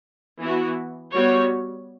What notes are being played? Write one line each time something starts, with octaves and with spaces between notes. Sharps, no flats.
E3 B3 F#4
G3 B3 F#4 C#5